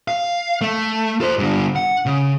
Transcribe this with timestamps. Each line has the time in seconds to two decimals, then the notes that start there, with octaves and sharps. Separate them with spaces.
0.08 F5
0.61 A3
1.21 A4 C5
1.39 G2 D3
1.76 F#5
2.06 C#3